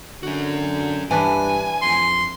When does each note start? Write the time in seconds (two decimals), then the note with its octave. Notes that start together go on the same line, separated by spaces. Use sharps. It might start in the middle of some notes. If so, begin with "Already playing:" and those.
0.23 D3 C#4 F#4
1.11 G2 E3 D4 B4 G#5
1.82 F2 C6